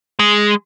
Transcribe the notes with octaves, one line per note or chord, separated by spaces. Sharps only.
G#3